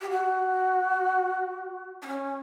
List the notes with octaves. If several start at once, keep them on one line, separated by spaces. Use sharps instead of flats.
G4
F#4
D4
C#4